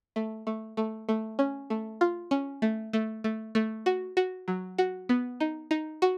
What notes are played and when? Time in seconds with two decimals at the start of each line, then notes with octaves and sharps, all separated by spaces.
0.16 A3
0.47 A3
0.77 A3
1.09 A3
1.39 C#4
1.70 A3
2.01 F4
2.31 C#4
2.62 A3
2.93 A3
3.24 A3
3.55 A3
3.86 F#4
4.17 F#4
4.48 F#3
4.78 F#4
5.09 B3
5.40 D#4
5.71 D#4
6.02 F#4